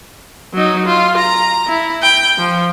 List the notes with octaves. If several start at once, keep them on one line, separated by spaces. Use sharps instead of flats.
F#3 D#4
F4
A#5
E4
G5
F3